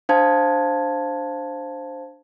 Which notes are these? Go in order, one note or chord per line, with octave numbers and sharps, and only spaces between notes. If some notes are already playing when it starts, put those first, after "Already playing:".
D4 C5 F5 A5 G#6